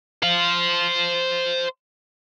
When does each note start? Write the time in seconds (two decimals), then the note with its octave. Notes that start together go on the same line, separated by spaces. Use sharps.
0.23 C5 F5